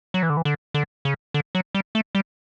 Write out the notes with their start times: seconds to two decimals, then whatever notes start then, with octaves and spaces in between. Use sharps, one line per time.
0.14 F#3
0.23 E3
0.30 D3
0.37 E3
0.45 D3
0.74 D3
1.05 C#3
1.34 D3
1.55 F#3
1.75 G3
1.95 A3
2.15 G3